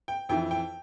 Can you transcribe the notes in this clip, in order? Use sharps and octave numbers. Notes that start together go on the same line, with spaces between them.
G5
F2 E3 G5
G5